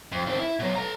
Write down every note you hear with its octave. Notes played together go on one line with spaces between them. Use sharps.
F2
D#3 C4
E4
B2 F#3
A4 A#5